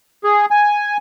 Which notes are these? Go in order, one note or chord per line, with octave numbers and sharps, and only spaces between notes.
G#4
G#5